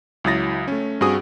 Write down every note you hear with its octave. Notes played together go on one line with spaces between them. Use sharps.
C#2 F#3 E4 D#6 A6 A#6
A3 C#4
G2 C4 F#4 G#4 D#6